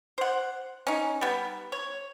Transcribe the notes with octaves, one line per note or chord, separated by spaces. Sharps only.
C5 F#5
C#4 D#4
G3 B3
C#5